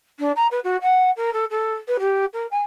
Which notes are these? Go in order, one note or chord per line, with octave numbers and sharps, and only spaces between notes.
D4
A#5
B4
F#4
F#5
A#4
A4
A4
B4
G4
A#4
G#5